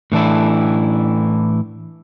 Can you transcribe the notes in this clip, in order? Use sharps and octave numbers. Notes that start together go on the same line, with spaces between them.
A2 E3 D4 E4